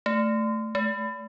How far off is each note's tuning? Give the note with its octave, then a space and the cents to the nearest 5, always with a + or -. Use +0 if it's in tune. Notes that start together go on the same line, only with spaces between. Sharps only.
A3 +5
A3 -40